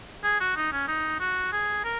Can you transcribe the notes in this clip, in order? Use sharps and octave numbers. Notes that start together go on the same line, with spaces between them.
G#4
F#4
D#4
C#4
D#4
F#4
G#4
A#4